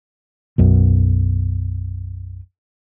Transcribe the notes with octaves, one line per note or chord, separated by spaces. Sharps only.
B1 F#2